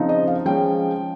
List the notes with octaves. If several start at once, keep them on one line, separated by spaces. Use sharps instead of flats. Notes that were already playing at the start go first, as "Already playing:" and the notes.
Already playing: C#3 F3 C4 D#4
D#5
F5
F3 G#3 C#4 G5